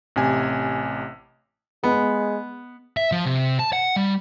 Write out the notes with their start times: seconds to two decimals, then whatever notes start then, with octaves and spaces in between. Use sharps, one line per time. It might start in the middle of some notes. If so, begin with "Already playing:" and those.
0.16 A1 C3 G#5
1.84 G#3 B3
2.97 E5
3.12 F3
3.25 C3
3.59 A5
3.73 F#5
3.96 G3